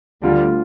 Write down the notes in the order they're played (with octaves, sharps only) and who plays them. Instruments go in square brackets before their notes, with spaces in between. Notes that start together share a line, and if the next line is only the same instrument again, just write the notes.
[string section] D2 D3 G3 [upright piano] F4